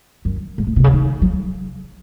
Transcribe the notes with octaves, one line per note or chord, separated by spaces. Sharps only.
F#2
G#2
A2
C3
C#3
D#3
F#3